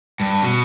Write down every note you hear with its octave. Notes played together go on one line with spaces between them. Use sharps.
G2
B2